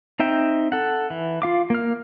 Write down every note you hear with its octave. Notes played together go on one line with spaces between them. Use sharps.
C4 D#4 E5 G5
A4 F#5
E3
F4 F5 D6
A#3 F6